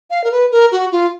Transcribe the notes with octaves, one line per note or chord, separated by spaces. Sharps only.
F5
A#4
B4
A#4
F#4
F4